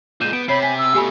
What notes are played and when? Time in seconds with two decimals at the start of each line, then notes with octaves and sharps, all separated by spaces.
0.21 A#2 G#3 G6 D#7 E7
0.33 B3 D7
0.49 C3 C#5 B5 C7
0.63 G#5 B6
0.78 E6
0.94 B2 A3 G4 G#5 B5